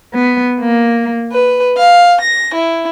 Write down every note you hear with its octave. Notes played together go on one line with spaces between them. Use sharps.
B3
A#3
B4
F5
A#6
E4